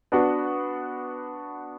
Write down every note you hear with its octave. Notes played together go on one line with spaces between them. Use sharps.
B3 D4 F#4